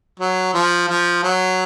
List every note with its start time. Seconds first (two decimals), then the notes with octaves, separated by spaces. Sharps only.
0.20 F#3
0.54 F3
0.89 F3
1.23 F#3